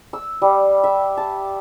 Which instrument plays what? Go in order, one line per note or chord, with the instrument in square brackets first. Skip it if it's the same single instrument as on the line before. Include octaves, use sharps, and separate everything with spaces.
[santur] E6
G3
E5
A5